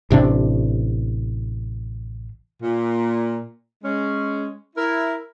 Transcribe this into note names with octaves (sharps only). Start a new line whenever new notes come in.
A1 C3 D#3 D4
A#2
G#3 C#4
E4 A#4